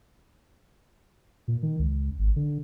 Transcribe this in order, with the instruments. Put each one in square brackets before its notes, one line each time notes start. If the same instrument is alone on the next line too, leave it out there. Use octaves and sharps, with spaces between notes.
[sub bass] A#2
D#3
C#2
G#1
D3